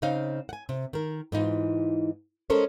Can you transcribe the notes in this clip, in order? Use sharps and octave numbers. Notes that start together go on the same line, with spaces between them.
C#3 C4 D#4 F5
F#5 G#5
C3
D#3 A#4
G#2 E3 D#4 F4
G#3 C#4 A4 A#4 C5 C#5